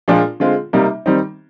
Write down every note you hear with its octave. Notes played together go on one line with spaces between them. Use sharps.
A#2 F3 G#3 D4 F4
D3 G#3 C4 F4
C3 G3 A#3 D#4
D#3 G3 C4 D#4